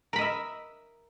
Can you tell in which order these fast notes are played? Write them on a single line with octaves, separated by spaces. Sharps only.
A#4 B5 D#5 E5